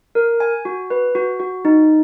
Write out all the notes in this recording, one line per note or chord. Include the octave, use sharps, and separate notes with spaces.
A#4
G#5
F#4
B4
F#4
F#4
D#4